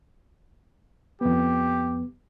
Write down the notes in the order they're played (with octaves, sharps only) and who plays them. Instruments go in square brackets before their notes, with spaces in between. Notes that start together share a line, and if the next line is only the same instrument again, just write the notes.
[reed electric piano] F2 B3 [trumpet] G4